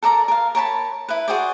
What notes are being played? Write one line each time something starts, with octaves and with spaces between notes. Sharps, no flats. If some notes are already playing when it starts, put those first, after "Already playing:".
A4 A#4 D5 A#5
A#4 F5
A#4 C#5 A5 B5
E4 B4
F#4 G#4 C5 D5